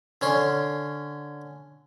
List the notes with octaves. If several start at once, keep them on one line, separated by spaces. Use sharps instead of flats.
D3 C#4 C6